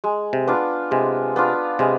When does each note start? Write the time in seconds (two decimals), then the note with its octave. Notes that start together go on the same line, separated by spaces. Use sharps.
0.04 G#3
0.33 C3
0.47 B3 D4 F4
0.91 C3 G#3
1.36 B3 D4 F4
1.79 C3 G#3